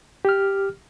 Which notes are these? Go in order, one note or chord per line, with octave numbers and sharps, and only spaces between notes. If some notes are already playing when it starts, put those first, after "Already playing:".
G4 F6